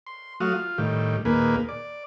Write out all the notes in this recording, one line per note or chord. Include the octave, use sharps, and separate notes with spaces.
C6
F#3 A3 F#4 F5 D#6
F4
A2 D#3 G3
D#2 A#2 A#3 G#4 B4
D5